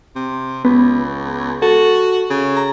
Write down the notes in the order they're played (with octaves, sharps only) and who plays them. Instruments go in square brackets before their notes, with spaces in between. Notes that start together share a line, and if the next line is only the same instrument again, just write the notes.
[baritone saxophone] C3
[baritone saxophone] C#2 [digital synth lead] B3
[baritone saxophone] F#4 [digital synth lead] A4
[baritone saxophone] C#3
[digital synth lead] A#5